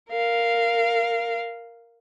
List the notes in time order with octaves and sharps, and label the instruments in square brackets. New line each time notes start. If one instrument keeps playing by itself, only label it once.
[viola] A#4 F5